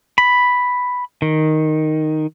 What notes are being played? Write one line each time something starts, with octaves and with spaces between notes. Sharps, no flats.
B5
D#3